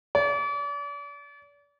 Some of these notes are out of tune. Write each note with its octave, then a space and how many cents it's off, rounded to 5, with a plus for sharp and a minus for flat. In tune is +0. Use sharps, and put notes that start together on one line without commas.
D5 -40